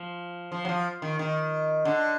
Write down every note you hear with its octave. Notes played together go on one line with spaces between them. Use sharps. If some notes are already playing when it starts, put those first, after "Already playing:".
Already playing: F3
F3
F#3
F3
D#3
D#3
D3